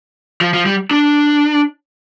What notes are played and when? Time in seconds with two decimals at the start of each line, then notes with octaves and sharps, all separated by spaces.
0.41 F3
0.54 F3
0.66 G3
0.91 D4